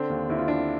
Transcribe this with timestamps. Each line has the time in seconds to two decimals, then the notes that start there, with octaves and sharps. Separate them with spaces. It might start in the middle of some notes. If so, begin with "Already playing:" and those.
Already playing: D3 C4 D4
0.10 D#2
0.29 D#2 E4
0.38 F4
0.48 D3 D4 E4